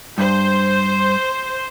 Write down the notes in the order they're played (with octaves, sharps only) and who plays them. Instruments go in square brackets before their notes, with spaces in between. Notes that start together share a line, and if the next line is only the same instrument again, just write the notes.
[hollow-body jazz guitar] G2 [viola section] C5